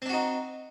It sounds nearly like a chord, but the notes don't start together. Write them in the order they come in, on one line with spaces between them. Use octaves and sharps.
C4 D4 F#4 D#4